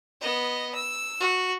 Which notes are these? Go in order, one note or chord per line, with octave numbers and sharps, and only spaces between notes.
B3 D#5
E6
F#4